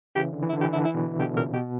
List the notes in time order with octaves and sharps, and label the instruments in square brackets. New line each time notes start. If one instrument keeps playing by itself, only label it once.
[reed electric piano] C#3 E3 [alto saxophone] G4
[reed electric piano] D3
E3
[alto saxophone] E4
[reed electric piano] D3
[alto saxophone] G4
[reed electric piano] E3
[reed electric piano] D3 [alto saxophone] E4
[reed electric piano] E3 [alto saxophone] E4
[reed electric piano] B2 D3
[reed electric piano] B2 D3 [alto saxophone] G4
[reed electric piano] A#2 C#3 [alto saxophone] A#4
[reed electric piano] B2 [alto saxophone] G4